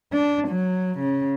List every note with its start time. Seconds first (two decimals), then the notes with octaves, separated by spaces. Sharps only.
0.12 D4
0.48 F#3
0.99 C#3